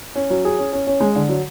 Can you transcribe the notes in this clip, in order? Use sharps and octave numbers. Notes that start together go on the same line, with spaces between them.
C#4
F#3
G#4
C#4
C#4
C#4
G#3
D3
F#3